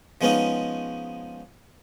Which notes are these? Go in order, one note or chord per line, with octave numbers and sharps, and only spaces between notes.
F3 G#3 B3 C#4 D#4 F4